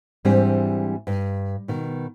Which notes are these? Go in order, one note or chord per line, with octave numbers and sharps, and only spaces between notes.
G#2 E3 G3 C4 D4
G2
B2 D#3